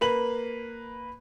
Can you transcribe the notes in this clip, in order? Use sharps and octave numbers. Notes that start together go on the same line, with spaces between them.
A#3 B4 F#7